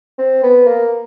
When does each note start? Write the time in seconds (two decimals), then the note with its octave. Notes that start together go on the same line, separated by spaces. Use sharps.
0.18 C4
0.43 B3
0.67 A#3